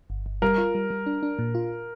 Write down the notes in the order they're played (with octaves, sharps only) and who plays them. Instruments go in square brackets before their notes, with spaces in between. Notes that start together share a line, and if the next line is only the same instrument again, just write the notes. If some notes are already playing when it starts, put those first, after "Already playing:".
[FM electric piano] G1
G1
[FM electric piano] G3 [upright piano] A#4
[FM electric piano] F4
G3
G3
D4
D4
A#2
F4